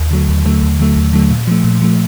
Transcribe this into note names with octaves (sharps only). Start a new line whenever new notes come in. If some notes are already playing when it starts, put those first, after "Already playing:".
Already playing: D#2
D3 F#3 A3
D#2
D3 F#3 A3
D#2
D3 F#3 A3
D#2
D3 F#3 A3
A#2
F3 A3
A#2
F3 A3